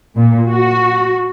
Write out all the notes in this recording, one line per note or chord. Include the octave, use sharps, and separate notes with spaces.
A#2
F#4